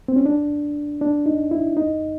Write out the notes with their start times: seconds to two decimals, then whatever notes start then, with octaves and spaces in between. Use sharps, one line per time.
0.08 C4
0.16 C#4
0.26 D4
1.01 D4
1.26 D#4
1.51 E4
1.77 D#4